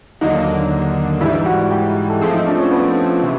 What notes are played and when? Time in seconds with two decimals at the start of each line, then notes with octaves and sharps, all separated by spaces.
0.21 D#2 D3 F#3 A#3 D4 D#4
1.21 G#2 E3 G3 E4
1.46 F#4
1.71 G4
2.09 A4
2.21 F3 A3 C4 G#4
2.34 D#4
2.47 D4
2.58 C#4
2.71 B3
3.23 C3 E3